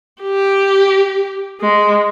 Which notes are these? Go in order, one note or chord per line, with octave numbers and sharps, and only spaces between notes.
G4
G#3